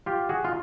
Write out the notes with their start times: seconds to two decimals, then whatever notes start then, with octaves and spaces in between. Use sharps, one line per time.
0.06 F4 G4
0.29 F#4 G#4
0.45 F4